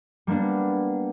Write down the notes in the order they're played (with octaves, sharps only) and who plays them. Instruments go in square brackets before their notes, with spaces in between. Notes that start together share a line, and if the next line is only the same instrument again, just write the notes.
[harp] G3 A#3 B3 D4